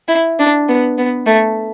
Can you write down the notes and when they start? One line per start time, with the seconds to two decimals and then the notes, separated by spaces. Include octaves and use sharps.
0.08 E4
0.39 D4
0.68 B3
0.98 B3
1.26 A3